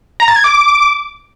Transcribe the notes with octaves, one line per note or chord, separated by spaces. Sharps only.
A#5
A6
G#6
D6